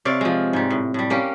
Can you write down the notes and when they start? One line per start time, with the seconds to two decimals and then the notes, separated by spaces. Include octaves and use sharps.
0.05 C3 C#5 D5 F5
0.21 F3 G#3
0.53 G#2 G3
0.70 A2
0.94 A2 G3
1.10 A#3 C#4 G4